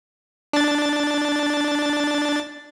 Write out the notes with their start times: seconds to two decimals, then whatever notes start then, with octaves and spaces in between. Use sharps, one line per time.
0.53 D4 A6